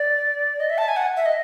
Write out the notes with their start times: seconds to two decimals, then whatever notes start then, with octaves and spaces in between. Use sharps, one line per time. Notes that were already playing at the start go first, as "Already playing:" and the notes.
Already playing: D5
0.60 D#5
0.70 E5
0.78 A5
0.88 G#5
0.97 F#5
1.17 E5
1.26 D#5